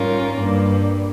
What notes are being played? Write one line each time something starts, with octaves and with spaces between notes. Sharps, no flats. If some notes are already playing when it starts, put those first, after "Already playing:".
Already playing: G#2 G3 C#4 F4 A#4
G2 G3 A#3